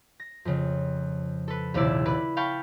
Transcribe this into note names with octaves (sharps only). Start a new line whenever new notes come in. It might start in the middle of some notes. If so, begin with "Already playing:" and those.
A#6
F2 C#3
A4 B4
A#1 D#2 C3 E4 D5 E6
B4 D5 B5
F5 G5 A5 B5 C#6